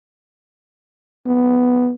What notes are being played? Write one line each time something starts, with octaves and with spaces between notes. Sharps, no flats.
B3